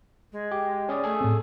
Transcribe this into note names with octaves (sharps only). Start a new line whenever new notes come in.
G#3
G4
C#4 G#4 D5
A3 G#4 A4
A2 C4